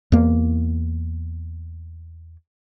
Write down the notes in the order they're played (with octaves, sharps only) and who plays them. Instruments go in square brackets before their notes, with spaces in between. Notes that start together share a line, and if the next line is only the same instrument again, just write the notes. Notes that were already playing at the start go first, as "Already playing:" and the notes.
[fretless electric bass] E2 A#3